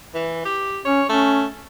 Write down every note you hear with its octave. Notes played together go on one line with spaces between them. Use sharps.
E3
G4
C#4 C#5
A3 C#4